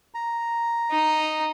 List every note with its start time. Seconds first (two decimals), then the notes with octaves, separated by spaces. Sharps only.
0.14 A#5
0.91 D#4